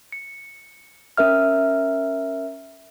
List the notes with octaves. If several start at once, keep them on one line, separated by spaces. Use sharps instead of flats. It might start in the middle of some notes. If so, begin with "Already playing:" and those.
C#7
C#4 A#4 E5 F6